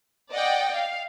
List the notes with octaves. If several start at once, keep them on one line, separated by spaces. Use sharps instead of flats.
D5 D#5 F#5 G5
F5